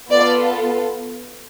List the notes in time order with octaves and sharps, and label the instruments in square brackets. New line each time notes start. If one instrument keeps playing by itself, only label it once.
[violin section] B3 F4 A4 D5